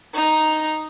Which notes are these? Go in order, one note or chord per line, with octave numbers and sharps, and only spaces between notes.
D#4 A#5